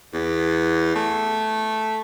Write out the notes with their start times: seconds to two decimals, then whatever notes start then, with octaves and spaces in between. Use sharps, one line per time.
0.13 E2
0.96 A3